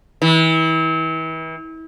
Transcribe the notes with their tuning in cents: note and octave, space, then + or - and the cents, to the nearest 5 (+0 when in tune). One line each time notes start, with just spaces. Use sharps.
E3 -35